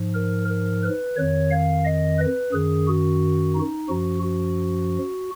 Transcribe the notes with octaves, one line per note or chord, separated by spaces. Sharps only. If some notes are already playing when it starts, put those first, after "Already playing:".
Already playing: G#2 F3
A#4
A#4
B4
F2 D#3 C#5
F5
D#5
B4
F#2 D#3 G#4
F#4
D#4
F#2 F3 F#4
F#4